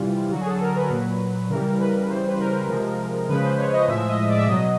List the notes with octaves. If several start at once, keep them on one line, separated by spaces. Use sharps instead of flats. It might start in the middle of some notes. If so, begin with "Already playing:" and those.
Already playing: C3 E3 G3 F4
D3 F#3 F#4
G#4
A4
A#4
B4
A#2 F#3
C#3 E3 G3 A#4
B4
C#3 E3 G3 C5
B4
A#4
C3 F3 G#3
C#3 F3 G#3 B4
C5
C#5
D#5
A2 F3 G#3 E5
D#5
D5
E5
B2 F#3 D#5